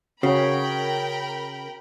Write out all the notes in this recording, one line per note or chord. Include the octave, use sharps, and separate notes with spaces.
C#3 F#4 A#4 C#5 G5 B5